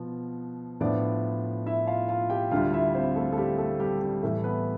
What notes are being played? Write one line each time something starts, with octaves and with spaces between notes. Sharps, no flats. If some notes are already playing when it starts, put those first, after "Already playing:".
Already playing: B2 F3 B3
A2 F3 B3 D4 D5
E4 E5
F4 F5
F4 F5
G4 G5
D2 D3 G3 F4 F5
E4 E5
C4 C5
A3 A4
A4
G3 G4
A3 A4
G3 G4
G3 G4
A2 E3 G3 A3 A4
B3 B4